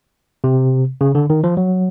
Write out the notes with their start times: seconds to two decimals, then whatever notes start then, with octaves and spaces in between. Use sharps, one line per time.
0.44 C3
1.01 C#3
1.15 D3
1.30 D#3
1.44 F3
1.57 F#3